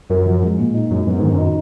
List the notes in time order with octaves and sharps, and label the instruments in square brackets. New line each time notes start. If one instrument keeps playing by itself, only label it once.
[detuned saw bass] F#2 [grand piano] A#4
[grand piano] F3
G#3
A#2
D#4
[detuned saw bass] F#2 [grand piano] G#3
[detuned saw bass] F#2 [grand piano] B3
[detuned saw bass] G#2 [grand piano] D#3
[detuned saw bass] F#2 [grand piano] D#4